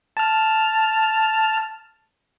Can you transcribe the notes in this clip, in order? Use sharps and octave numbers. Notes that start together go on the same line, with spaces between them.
A5 F6